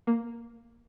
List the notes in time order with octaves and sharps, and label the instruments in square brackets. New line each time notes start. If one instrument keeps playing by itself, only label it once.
[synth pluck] A#3